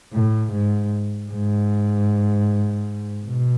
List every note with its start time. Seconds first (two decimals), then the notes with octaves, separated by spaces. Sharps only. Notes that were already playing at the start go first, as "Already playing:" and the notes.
0.13 A2
0.52 G#2
1.31 G#2
3.26 B2